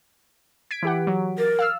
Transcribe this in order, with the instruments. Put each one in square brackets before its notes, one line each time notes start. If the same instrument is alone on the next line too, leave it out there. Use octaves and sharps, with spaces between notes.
[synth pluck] G#6 B6 D7
E3 G4 F#5
F#3
[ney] A#4 [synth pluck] A6
[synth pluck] F5 E6 F6